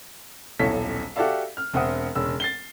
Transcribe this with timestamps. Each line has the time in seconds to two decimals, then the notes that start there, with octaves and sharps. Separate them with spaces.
0.59 D#1 B1 E4 A4 C#5 B6
1.16 F#4 G4 A4 D5 E5 F5
1.57 F6
1.74 E1 C4 E5 F#5 D#6
2.15 E1 C#3 E6
2.40 A6 C7 G7